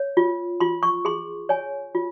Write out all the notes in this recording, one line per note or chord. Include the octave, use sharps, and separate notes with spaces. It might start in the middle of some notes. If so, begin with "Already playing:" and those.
Already playing: C#5
F4
F4 C6
C#6
G#4 C6
C#5 G#5
F4